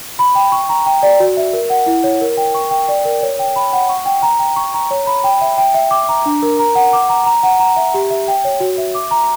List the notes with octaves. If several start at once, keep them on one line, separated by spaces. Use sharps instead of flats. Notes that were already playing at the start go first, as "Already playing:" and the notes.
B5
G5
C#6
A#5
G5
D5
F#4
E5
A#4
F#5
E4
C#5
A#4
G5
C#6
G5
D5
A#4
C#5
G5
B5
F#5
C#6
G5
A#5
G5
C#6
A#5
C#5
B5
G5
E5
G5
E5
D6
A#5
D4
A#4
A#5
F#5
D6
A#5
A#5
F#5
A#5
E5
G4
E5
G5
C#5
F#4
E5
D6
A#5